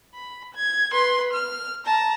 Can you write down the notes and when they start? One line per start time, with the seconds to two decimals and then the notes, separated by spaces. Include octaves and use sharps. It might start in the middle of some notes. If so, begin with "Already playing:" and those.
0.14 B5
0.55 G#6
0.92 B4 C6
1.33 F6
1.85 A5 A#5